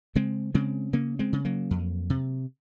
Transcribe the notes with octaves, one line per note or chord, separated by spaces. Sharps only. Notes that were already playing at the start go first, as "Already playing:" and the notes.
C#3 G#3 C4
C#3 G#3 C4
C#3 A#3 C#4
G#3 C4
C#3
F#3 A#3
F2
C3